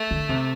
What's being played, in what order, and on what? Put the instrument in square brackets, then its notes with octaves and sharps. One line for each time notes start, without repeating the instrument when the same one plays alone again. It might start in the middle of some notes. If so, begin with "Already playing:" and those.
Already playing: [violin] A3
[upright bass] D3
C3